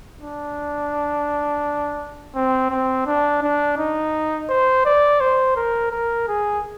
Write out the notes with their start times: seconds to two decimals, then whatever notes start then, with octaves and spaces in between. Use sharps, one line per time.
0.21 D4
2.35 C4
2.71 C4
3.06 D4
3.42 D4
3.78 D#4
4.49 C5
4.85 D5
5.20 C5
5.56 A#4
5.92 A#4
6.28 G#4